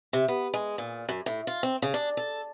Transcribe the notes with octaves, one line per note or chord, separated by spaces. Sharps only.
C3
B3
G#3
A#2
F#2
A2
F4
C4
C#3
D4
A4